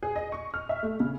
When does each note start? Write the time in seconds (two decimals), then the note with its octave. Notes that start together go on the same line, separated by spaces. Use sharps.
0.03 G#4
0.16 D#5
0.32 C#6
0.54 F6
0.69 E5
0.83 A3
1.00 C#3